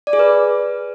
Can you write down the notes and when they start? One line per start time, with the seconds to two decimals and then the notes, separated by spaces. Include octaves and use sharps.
0.07 D5
0.13 G#4
0.19 B4